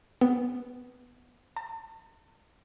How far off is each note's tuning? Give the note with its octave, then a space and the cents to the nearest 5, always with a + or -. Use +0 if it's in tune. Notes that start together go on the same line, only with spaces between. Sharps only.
B3 +0
A5 +35